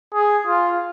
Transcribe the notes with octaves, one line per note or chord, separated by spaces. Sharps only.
G#4
F4